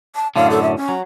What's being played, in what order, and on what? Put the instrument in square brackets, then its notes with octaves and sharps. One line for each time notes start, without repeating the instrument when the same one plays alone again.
[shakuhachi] A5
[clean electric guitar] F#2 A2 D3 [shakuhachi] F5
[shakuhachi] A4
E5
C#4
[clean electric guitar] F#3